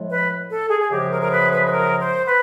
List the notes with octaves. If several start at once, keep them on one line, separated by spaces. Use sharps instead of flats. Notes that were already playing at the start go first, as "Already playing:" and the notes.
Already playing: A2 F3 G#3
B4
A4
G#4
G#4
F#2 C#3 F3 G#3 G4
A#4
A#4
B4
B4
B4
A#4
C5
B4